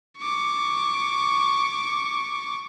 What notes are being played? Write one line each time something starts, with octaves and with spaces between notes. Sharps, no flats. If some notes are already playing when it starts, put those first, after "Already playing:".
C#6 D6